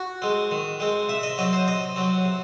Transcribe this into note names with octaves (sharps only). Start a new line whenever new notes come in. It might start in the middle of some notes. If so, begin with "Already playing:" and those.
Already playing: F#4
G#3 C4
D#3
G#3 C4
C3 E5
D#5
F#3 C4 D#5
C5
C3 D#5
F#3 C4
C3